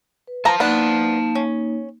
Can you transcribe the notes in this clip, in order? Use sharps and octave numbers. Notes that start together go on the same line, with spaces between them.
B4
F3 F5 A5 A#5
A#3 B3 D4 D#4
C#4